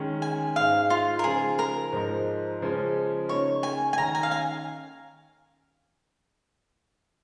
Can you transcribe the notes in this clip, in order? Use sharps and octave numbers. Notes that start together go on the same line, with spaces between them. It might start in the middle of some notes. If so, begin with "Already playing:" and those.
Already playing: D#3 G#3 C#4
G#5
G#2 G#3 D#4 F5
F4
A#4
C#3 F3 G#3 D#4 G#4
A#4
G#2 F3 G#3 D#4
C#3 F3 G#3 C#4
C#3 A#3 D#4 C#5
G#5
G#5
D#3 C#4 A#5
G#5
F5
G#5